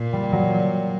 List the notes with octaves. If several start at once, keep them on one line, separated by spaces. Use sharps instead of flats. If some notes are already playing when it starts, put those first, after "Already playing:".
Already playing: A#2
G3
F#3